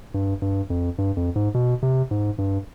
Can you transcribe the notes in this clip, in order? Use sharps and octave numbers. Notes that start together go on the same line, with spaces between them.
G2
G2
F2
G2
F2
G#2
B2
C3
G#2
G2